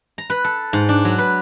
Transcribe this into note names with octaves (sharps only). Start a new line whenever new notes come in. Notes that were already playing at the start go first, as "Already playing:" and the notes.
A#5
B4
A4
G#2
D4
F#3
B4